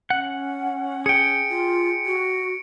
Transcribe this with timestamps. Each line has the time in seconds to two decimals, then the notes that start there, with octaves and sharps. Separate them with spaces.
0.10 C#4 F#5
1.06 G#4 G5 C#7 D7
1.49 F4
2.06 F#4